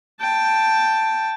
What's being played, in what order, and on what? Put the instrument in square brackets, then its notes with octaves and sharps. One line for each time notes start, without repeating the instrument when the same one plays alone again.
[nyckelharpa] G5 A5